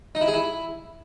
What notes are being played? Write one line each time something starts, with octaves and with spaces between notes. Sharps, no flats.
D#4
E4
G#4
E4